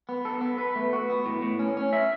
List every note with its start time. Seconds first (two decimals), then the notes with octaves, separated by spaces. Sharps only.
0.09 B3
0.25 A4
0.41 B3
0.58 B4
0.75 A3
0.93 F#4
1.10 B3
1.26 A2
1.42 A2
1.59 C#4
1.77 C#4
1.93 E5